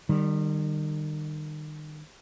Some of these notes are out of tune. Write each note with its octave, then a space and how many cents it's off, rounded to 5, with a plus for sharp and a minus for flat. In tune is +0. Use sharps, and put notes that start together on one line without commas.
D#3 -35 G3 +0